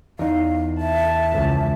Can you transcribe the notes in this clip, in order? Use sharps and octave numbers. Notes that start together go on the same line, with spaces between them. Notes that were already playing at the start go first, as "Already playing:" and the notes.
E2 D#4 F5
E5 A5
C#2